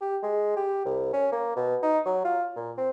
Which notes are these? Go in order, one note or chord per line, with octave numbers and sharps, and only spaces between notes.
G4
G#3
G4
C2
C#4
A#3
B2
D#4
F#3
F4
A#2
C4